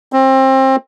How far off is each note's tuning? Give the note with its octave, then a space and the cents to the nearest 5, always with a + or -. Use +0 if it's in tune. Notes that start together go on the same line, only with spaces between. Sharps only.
C4 +25